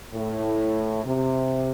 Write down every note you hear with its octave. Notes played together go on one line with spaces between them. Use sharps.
A2
C3